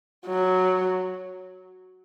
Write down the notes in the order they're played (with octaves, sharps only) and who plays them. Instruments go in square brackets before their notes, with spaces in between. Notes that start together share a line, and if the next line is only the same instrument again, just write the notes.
[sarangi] F#3